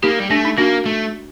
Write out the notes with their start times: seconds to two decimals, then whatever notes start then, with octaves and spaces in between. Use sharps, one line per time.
0.03 A#3 D#4 G4
0.19 G3
0.30 A3 D4
0.45 D#4
0.57 A#3 D4 F#4
0.86 A3